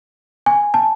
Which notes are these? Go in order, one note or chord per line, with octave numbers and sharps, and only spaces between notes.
G#5
A5